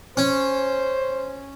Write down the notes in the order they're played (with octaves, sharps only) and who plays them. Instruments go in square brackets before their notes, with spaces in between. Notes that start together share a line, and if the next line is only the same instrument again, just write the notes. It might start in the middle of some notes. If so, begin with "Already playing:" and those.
[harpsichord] C#4 [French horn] C5